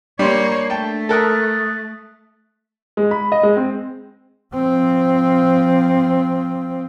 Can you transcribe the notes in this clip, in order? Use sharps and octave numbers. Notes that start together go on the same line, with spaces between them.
G3 A#3 D4 C#5 C6
A3 G5 A5
A4 A#4 D#6 F#6 A6
G#3
B5
D#5
G#3
C4
F3 C4